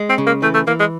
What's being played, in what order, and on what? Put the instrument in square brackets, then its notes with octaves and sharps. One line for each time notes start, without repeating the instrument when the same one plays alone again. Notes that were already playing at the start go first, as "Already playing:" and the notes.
Already playing: [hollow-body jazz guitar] G#3
[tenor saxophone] C4
[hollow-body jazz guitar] C#3
[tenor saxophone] A#3
[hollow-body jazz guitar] E3 [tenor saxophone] A3
[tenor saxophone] A3
[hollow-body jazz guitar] E3 [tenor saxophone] A#3
[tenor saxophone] G#3